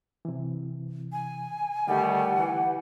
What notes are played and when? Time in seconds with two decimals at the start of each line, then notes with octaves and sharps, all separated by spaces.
0.25 C3 E3
1.12 G#5
1.88 D3 D#3 G3 A3 G4 F#5
2.36 E3